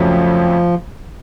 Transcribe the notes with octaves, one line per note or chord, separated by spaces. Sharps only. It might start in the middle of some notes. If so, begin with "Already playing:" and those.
Already playing: F2 C#3 F3 F#3 A3 C#4